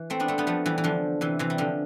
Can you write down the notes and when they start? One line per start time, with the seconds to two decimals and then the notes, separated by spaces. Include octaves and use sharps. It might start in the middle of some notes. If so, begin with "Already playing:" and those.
Already playing: E3
0.10 A3 C4
0.20 B3 D4
0.28 A3 C4
0.38 G3 B3
0.47 F3 A3
0.66 E3 G3
0.78 E3
0.84 D3 F3
1.21 C3 E3
1.39 C3 E3
1.50 G3
1.58 D3 F3